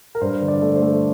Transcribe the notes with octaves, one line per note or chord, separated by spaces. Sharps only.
A#4
G2 C5
D3
D5
A3
C5
A3